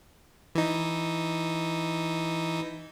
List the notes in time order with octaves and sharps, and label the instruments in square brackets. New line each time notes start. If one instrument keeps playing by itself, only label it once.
[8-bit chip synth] E3 D#4